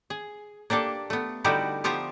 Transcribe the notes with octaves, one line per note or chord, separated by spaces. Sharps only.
G#4
A#3 D4 G4 A4
A3 B3
D3 G3 D#4 E4 F#4 G4
F3 B3 F4 G4 E5 A#5